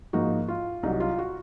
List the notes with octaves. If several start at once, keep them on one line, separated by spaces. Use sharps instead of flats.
G#2 F3 A#3 D#4 F#4
F4
C2 C3 F#3 D#4
F4
F#4